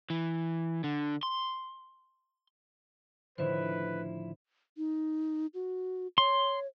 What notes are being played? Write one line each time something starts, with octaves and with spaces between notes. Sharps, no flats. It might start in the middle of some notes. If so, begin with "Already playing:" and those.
E3
D3
C6
A2 D3 D#3 F3 E4 B4 C5
D#4
F#4
C#5 C6